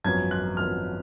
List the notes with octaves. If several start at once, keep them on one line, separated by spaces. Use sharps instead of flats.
G#1 F#2 F3 B3 G#6
F#6
G#1 F#2 F3 B3 F6